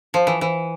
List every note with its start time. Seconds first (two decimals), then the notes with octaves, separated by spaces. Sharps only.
0.14 F3
0.27 E3
0.41 E3